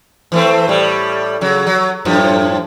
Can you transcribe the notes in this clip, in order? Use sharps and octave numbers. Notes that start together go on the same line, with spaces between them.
E3 A3 C4
A2 G3
C#3 F#3
F#3
F#2 A2 F3